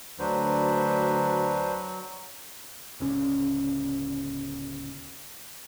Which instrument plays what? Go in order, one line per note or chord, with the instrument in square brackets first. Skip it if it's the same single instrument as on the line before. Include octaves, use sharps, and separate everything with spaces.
[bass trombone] D2 [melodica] F#3 [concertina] D4 B4 C5
[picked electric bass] D1 C#2 C#4